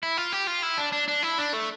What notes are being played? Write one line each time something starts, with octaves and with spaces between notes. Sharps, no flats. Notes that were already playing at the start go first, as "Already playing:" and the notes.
E4
F4
G4
F4
E4
D4
D4
D4
E4
D4
A3